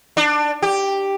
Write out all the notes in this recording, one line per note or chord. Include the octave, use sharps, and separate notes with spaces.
D4
G4